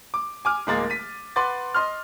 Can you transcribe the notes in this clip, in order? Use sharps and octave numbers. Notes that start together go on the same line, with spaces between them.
D6
G#5 D6 F6
D1 G#3 A#3 A6
B6 D#7
B4 F#5 C6 D6 A6
D#5 C6 F6